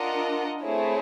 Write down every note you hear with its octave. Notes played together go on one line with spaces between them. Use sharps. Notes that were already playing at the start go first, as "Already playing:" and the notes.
Already playing: D4 F4 A#4 D#5 F#5
A3 C4 E4 G#4 C#5